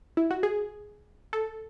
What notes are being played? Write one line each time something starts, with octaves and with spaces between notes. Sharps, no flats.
E4
F#4
G#4
A4